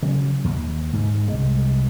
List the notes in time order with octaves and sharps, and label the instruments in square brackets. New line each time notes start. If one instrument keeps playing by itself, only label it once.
[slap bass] C#3 F#3
D#2
G#2
C2 G#3